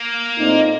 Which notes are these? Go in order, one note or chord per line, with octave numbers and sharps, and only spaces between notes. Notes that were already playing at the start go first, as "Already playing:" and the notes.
Already playing: A#3
A#2 A3 C4 D#4